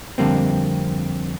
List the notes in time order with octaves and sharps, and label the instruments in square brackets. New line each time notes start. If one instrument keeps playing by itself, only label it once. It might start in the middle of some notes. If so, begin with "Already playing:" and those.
[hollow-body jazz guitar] F2 D3 G3 A#3 C4